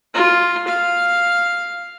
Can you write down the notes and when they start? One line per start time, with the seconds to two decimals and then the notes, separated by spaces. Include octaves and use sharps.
0.14 F4
0.67 F5